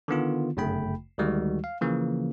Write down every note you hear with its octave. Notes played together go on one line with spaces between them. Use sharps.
D3 D#3 B3 F4
G1 F#2 C#3 A3 G5 B5
D2 D#3 G3 G#3 F#4
F5
C#3 E3 F3 A#3